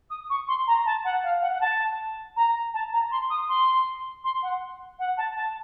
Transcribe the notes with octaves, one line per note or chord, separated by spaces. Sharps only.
D#6
C#6
C6
A#5
A5
F#5
F5
F#5
F#5
A5
A#5
A5
A#5
C6
D#6
C6
C6
F#5
F#5
A5
A5